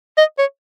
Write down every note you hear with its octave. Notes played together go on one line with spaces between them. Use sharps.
D#5
C#5